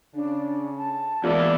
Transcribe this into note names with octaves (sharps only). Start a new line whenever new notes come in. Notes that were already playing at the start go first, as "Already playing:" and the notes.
C#3 D4
A5
E2 E3 G#3 A#3 E4 F4 D5